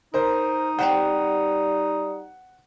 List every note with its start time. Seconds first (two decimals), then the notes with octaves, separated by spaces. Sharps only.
0.14 D#4 A#4 C5
0.79 G3 C4 G4 C5 F#5